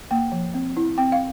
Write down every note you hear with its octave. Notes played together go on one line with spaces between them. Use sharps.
A#3 G5
F3
C4
E4
C4 G5
F5